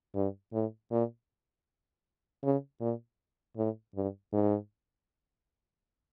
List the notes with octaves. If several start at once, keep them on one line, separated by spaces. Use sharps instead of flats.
G2
A2
A#2
C#3
A#2
A2
G2
G#2